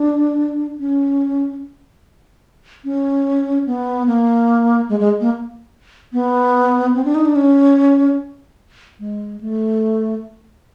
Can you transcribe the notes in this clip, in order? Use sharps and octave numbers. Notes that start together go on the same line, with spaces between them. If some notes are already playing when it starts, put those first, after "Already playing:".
Already playing: D4
C#4
C#4
B3
A#3
G#3
G#3
A#3
B3
C4
D4
D#4
D4
C#4
G#3
A3